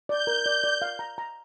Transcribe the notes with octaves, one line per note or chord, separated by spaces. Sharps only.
D5 G6
A#4
D5
D5
F5
A#5
A#5